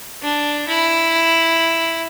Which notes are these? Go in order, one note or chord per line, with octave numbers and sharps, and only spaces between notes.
D4
E4